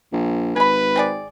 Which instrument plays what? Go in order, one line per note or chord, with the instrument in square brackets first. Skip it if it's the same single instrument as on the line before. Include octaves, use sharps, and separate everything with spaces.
[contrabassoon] A#1
[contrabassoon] G#1 [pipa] G#4 B5 [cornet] B4
[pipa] C4 G#4 D5